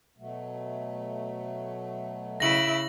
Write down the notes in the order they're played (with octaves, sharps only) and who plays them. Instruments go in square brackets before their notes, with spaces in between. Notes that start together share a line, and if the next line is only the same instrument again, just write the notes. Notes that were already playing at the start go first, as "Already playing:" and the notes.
[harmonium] B2 F#3 A3
[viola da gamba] C#3 E4 [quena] E5 [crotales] A#6 F#7